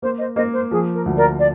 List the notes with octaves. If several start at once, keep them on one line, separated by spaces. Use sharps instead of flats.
A#3 C5
C5 D#5
A#3 C5 D#5
C5
F3 G#4
A#4
D2
A#4 D5
D5